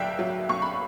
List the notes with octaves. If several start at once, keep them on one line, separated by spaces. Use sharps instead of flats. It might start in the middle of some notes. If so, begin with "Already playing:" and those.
Already playing: B1 B2 D5 E5 G5
F#3
B1 C#6
B5